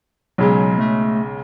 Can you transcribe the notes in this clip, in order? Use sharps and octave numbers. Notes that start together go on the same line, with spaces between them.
B1 C#3 F#3 G#3
A3